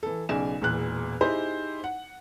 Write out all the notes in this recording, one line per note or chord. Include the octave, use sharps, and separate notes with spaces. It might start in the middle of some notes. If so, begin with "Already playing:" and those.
E3 A4
B1 C#3 D5 G#5 E7
E1 E2 A#2 F#6
D#4 E4 G4 G#4 C5
F#5